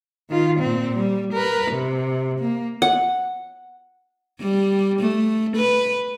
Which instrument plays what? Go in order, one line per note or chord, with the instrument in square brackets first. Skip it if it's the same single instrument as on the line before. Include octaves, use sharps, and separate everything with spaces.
[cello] D#3 F4
A#2 C4
G3
A#4 B4
C3
A#3
[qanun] F#5
[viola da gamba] G3
A3
B4